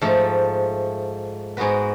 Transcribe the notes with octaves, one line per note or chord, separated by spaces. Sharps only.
G#2 F3 A3
G#2 G#3 B3 F#4 B4